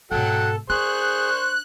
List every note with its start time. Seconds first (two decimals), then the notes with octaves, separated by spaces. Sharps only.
0.12 G#2 B2 F#3 A4 F#5 G5
0.70 D4 G#4 C5 C#6 F#6